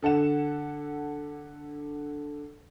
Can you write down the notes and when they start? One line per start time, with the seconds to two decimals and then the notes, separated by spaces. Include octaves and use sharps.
0.02 D3 A4 F#5 E7